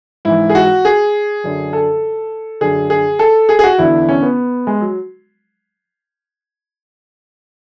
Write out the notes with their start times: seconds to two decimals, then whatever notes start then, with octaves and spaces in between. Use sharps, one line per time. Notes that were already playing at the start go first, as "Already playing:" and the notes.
0.25 G#2 E3 E4
0.50 G#4
0.55 F#4
0.85 G#4
1.44 F#2 D3
1.73 A4
2.61 F#2 D3 G#4
2.90 G#4
3.19 A4
3.49 G#4
3.59 G#4
3.64 F#4
3.78 E2 D3 E4
4.09 C#4
4.22 B3
4.67 G#3
4.81 F#3